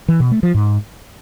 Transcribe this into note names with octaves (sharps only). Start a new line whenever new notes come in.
E3
B2
A3
F3
G#2